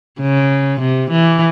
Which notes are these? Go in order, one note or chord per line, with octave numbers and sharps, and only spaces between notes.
C#3
C3
E3